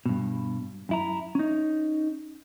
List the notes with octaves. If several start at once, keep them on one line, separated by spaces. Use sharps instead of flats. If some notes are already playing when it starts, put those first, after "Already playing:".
G2 B2
F#2 E4 A#5
C#4 D#4